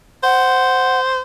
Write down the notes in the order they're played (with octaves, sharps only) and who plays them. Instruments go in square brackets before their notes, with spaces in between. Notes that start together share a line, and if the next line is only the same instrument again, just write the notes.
[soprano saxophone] C5 [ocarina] F#5